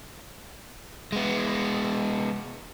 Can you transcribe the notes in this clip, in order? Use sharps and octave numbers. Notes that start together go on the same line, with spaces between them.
G#3 B3